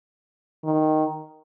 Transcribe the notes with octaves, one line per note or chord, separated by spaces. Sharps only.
D#3